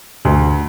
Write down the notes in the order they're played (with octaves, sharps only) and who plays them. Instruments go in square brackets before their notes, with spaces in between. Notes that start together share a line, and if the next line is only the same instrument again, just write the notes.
[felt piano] D2